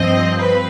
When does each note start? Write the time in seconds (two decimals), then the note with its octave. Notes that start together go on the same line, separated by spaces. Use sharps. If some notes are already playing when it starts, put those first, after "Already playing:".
Already playing: G2 F3 C4 D#5
0.39 B4